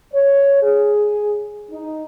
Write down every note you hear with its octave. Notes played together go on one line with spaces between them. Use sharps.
C#5
G#4
D#4